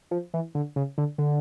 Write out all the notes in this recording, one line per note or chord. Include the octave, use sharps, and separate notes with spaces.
F3
E3
D3
C#3
D3
D3